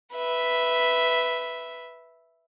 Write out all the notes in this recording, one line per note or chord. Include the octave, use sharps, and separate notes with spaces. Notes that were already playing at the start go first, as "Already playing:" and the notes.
B4 E5